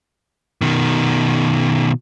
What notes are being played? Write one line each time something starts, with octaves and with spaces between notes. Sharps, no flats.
B2 D#3